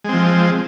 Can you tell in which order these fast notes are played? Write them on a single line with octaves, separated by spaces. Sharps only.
G#3 C4 F3